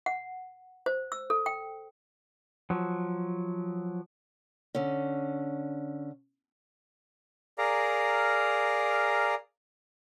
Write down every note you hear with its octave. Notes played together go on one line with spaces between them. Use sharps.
F#5
C5
E6
A4
G5
F3 F#3
D3 C#4
G#4 A#4 D5 F5 A#5